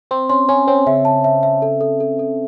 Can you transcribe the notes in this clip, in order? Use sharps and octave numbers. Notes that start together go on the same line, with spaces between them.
C4 C6
C#4 C6
C#4 G#5
C4 C#5
C#3 E5
A5
E5
E5
A4
A4
A4
A4